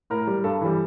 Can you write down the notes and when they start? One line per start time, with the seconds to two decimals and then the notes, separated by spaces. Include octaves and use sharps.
0.10 A2 A#4
0.27 G3
0.44 G2 A4
0.61 E3 G3